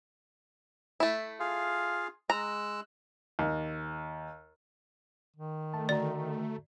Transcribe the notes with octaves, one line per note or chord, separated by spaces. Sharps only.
A3 E4
F4 G#4 F5
G#3 A#5 E6 F#6
D#2
D#3
A3 A5
D3 F#4 D5 A#5